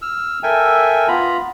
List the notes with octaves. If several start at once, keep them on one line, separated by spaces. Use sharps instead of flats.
E6 F6
A4 A#4 E5 G5 G#5
B3 F4 A#5 B5